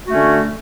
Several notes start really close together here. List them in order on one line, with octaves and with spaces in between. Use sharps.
F#4 A3 C#4 D3